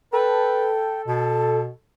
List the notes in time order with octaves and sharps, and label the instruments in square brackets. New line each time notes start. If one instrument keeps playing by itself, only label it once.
[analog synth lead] A4 [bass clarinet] B4 [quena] G5
[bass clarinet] B2 [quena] A5